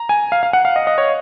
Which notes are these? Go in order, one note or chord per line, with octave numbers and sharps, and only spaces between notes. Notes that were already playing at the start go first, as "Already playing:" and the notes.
Already playing: A#5
G#5
F5
F5
F#5
F5
D#5
D#5
C#5